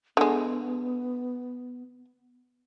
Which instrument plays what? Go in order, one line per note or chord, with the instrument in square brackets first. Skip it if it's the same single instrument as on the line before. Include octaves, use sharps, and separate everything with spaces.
[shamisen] D3 G#3 [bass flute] B3